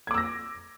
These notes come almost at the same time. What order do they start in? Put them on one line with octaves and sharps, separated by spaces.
G#6 D6 E6 A#6